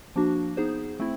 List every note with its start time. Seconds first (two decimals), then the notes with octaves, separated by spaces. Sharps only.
0.16 F3 A#3 D4 F#4
0.57 B3 D#4 G#4 C5
0.99 A3 C4 E4